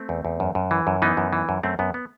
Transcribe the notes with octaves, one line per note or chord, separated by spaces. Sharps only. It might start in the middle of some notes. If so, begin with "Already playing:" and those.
Already playing: A3 C4
E2
E2
F#2
F#2
E3
F#2
E3 B3 D#4
F#2
E3
F#2
F#2 A3 C4
F#2 B3
B3